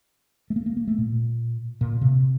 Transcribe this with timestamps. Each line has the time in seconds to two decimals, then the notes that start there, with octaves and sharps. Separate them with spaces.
0.50 A3
0.56 A#3
0.66 A#3
0.77 A#3
0.88 A3
0.98 A#2
1.81 A#2
2.01 C3